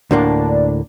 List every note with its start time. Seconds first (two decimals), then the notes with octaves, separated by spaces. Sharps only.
0.11 D2 A2 A#3 D4